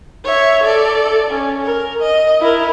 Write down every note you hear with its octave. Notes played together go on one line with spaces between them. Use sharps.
C#5 E5
A4 D5
C#4
A#4
D#5
E4 A#4